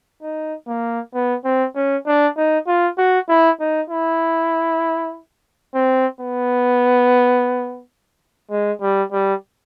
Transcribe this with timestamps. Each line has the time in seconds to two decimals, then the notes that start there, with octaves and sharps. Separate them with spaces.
0.23 D#4
0.68 A#3
1.14 B3
1.45 C4
1.76 C#4
2.07 D4
2.37 D#4
2.67 F4
2.98 F#4
3.29 E4
3.60 D#4
3.90 E4
5.75 C4
6.21 B3
8.51 G#3
8.82 G3
9.12 G3